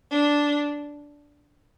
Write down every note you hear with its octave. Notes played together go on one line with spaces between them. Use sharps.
D4